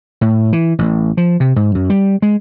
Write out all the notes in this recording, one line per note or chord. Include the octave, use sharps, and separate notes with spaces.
A2
E3
A1
F3
C3
G#2
F#2
G3
G#3